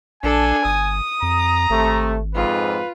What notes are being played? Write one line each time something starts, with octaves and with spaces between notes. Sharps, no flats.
A#1 D4 A4 G#5
G1 D#6
F2 A#5
G#1 C3 A3
F2 G#2 F4 B4